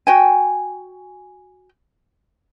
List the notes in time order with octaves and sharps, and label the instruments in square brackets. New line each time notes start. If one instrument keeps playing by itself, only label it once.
[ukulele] F#4 G5 G#5